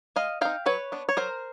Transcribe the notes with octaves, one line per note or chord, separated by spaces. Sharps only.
G#3 D#5 F5
C4 D#4 F5 G5
F#3 B4 C#5
B3 D4
C#5
F#3 A#4 C5